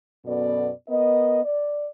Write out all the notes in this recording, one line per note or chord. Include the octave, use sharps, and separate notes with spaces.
F#2 B2 B3 A4 D5
B3 A#4 D#5
D5